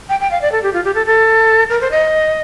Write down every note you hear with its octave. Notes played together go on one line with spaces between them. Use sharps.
G5
G5
F5
D5
A4
G4
F4
G4
A4
A4
A#4
C5
D#5